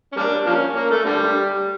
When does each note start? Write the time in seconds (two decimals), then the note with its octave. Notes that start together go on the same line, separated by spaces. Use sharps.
0.12 C#4
0.17 G3 A#3 D4
0.46 F3 A#3 C#4
0.76 A#3
0.91 A3
1.05 D3 G3